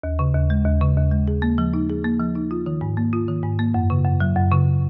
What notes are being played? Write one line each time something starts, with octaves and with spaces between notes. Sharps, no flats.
D#2
C#3
D#2
G#3
D#2
C#3
D#2
G#3
G#4
A#3
F3
D#4
G#4
A#3
F3
D#4
F4
D#3
G#2
A#3
F4
D#3
G#2
A#3
F#2
C#3
F#2
F#3
F#2
C#3